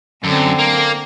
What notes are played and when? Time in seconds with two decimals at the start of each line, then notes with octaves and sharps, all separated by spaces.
0.24 F#2 D3 C4
0.59 A#3